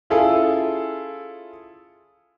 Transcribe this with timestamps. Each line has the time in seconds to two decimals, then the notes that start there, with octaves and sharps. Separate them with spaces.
0.10 C#4 E4 F4 G#4 A4